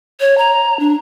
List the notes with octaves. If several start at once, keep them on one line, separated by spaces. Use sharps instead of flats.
C#5
A#5
D4